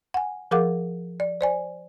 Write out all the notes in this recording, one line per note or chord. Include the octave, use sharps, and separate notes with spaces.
F#5 G#5
F3 G#4 A#4 F5 F#5 D6
D5
C5 D5 G#5